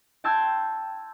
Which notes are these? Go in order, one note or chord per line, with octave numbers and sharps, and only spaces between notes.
G5 A5 C6 E6 G6 G#6